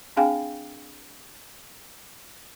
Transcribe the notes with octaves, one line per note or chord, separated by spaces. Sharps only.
C4 D4 G#4 F5 G5 G#5